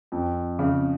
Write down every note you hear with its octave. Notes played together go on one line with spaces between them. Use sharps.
F2
C#3